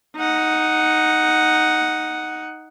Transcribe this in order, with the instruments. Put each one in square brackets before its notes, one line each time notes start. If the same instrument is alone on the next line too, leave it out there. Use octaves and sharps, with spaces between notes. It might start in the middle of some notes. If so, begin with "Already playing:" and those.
[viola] D#4 F#5